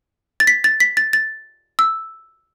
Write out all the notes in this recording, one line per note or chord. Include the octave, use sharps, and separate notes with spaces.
A6
B6
A6
B6
A6
A6
E6